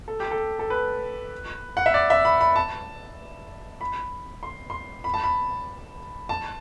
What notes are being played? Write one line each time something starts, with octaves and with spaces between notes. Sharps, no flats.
A4
G4
A4
A4
B4
F#5
E5
D5
E5
B5
B5
A5
B5
C6
C6
B5
A5
B5
A5